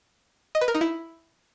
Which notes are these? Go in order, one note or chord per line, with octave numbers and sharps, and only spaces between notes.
D#5
B4
A#4
D#4
E4